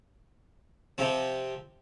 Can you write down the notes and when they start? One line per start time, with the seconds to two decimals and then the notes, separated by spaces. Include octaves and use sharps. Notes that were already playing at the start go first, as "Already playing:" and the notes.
0.98 C3 F3 C4